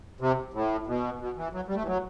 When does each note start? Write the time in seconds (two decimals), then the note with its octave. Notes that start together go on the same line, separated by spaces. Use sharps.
0.21 C3
0.54 A2
0.87 B2
1.20 B2
1.37 E3
1.53 F#3
1.68 G3
1.75 A3
1.82 E3
1.86 F#3